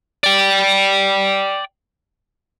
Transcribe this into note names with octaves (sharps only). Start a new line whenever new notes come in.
D5 G5